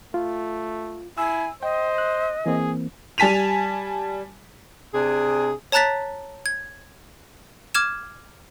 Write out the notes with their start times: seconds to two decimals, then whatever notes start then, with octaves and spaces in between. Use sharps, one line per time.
0.14 A3 F4
1.18 E4 G#5 E6
1.63 C5 D#5 G5
1.98 F#6
2.46 E3 A#3 C4 G#4
3.18 G3 G#5 A5 B6 D#7 F7
4.93 C3 D4 G#4
5.72 C#5 A5 A#5 F#6 A6 B6
6.46 G#6
7.74 D6 F6 G#6 E7